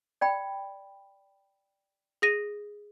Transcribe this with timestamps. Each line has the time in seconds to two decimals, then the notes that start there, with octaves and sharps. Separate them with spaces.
0.21 D5 G5 B5
2.22 G#4 A#6 D#7